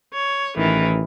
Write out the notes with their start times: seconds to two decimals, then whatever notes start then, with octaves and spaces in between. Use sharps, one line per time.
0.13 C#5
0.57 A1 D#3 E3